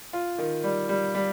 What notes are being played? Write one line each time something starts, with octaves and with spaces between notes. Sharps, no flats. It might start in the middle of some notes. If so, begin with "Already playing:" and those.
F4
D#3
G3
G3
G3